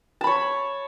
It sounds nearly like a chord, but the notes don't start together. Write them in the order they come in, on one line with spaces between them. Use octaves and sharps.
A5 B5 C#5